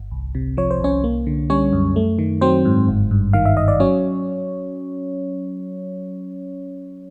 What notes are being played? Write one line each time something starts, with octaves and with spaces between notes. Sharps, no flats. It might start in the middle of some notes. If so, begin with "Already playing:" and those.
Already playing: G1
C2
C3
F3 C#5
C5
C2 C#4 C#5
A#3
D3
G3 C#4 C#5
F#2
A3
D#3
F#3 C4 C5
G#2
G1
G2
D#3 F5
E5
G1 D#5
D5
F#3 C#4 C#5